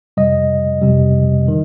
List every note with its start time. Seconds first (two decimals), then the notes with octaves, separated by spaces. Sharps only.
0.17 F2 C3 G3 D#5
0.82 F2 C3 G3
1.48 D#3